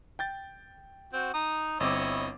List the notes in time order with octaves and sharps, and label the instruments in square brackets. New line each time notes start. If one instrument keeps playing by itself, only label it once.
[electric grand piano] G5 G6 A6
[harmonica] C4 F#4
D#4 D#6
[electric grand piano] G1 C4 D6 [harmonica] E4 C#5 D#5